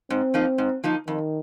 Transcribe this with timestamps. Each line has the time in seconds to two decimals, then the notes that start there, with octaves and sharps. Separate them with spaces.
0.10 G#2 C4
0.34 F3 A#3 D#4
0.58 G#2
0.84 F3 A#3 D#4
1.07 F2 D#3